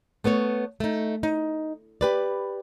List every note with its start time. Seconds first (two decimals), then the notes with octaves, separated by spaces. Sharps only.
0.24 A3 B3 A4 C#5
0.80 A3 D#4
1.23 D#4
2.01 G4 B4 D5